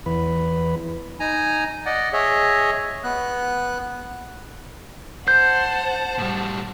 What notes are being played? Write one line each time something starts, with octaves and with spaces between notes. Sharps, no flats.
E2 B4
D#4 G#5 A#5
D5 D#5 F#5
G#4 C#5 D#5 E5
B3 F#6
C5 F#5 A5 G6
A2 G3